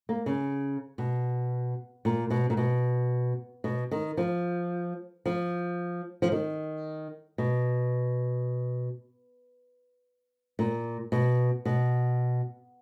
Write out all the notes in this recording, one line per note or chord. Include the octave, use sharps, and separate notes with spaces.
A#3
C#3
B2
A#2
B2
A#2
B2
B2
D#3
F3
F3
F3
D#3
B2
A#2
B2
B2